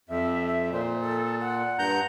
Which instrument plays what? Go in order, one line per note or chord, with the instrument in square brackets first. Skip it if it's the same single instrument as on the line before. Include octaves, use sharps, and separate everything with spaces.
[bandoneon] F2 [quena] E5
[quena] E5
[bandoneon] A#2 [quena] C5
[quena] A4
F#5
[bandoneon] G2 A#5 G6